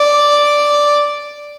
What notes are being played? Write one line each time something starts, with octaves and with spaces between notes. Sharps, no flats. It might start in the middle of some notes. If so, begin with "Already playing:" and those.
Already playing: D5